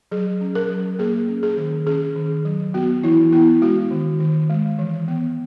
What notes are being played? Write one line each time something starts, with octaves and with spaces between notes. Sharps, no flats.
F#3 G#4
C#4
A#4
F#3
A#3 G#4
C#4
G#4
D#3
C#4 G#4
D#3
F#3
B3 F#4
E3 E4
B3 E4
G#3 F#4
D#3
D#3
G#3
E3
B3